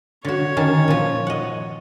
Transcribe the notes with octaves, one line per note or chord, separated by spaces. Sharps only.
D3 F#4 C#5
D#3 C#4 A5
A#2 F3
D#5 F#5